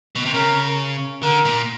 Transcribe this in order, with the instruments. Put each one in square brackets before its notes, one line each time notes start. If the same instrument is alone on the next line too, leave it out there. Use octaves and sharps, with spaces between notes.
[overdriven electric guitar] B2
C3
[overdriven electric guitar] C#3 [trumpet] A#4
[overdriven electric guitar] D3 [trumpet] A#4
[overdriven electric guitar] A#2